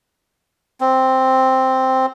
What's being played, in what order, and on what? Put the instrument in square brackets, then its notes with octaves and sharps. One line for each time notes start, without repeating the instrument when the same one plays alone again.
[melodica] C4